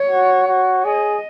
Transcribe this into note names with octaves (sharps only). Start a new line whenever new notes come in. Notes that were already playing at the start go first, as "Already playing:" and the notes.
Already playing: C#5
F#4
F#4
G#4 D#5